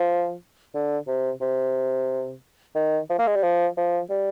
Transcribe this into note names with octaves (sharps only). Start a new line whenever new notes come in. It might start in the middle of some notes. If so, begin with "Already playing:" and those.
Already playing: F3
D3
C3
C3
D#3
F3
A#3
G#3
G3
F3
F3
G3